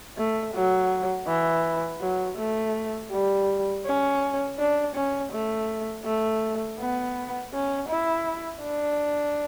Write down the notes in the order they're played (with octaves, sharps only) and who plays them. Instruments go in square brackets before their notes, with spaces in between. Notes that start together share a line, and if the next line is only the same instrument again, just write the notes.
[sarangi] A3
F#3
E3
F#3
A3
G3
C#4
D4
C#4
A3
A3
B3
C#4
E4
D4